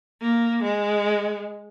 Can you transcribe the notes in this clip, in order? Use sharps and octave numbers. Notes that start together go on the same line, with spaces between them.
A#3
G#3